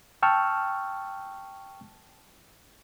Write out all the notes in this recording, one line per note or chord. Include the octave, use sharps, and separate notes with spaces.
G5 A5 C#6 E6 F6